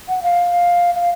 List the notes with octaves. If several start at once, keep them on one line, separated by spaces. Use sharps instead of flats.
F#5
F5
F5